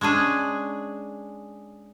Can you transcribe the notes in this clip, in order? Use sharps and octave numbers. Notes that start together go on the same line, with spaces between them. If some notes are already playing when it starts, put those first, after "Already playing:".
G#3 C#4 D4 G#4